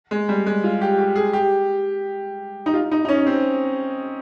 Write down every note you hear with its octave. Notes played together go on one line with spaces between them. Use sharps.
G#3
G3
G#3
F4
G4
G4
G#4
G4
D#4
F4
D#4
D#4
C#4
C4